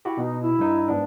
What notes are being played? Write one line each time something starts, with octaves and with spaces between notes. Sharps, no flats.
E4 F#4 G4
B2 D#4
E4
G2 D#4
G#2 B3 D4